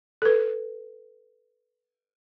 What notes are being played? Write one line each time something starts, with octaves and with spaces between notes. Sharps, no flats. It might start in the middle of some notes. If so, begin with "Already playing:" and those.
A4 B4